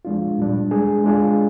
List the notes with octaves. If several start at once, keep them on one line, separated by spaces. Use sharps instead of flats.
F3 G#3 D4 F4
A#2 G3 D4
G#3 D4 G#4
G#3 D4 F4 G#4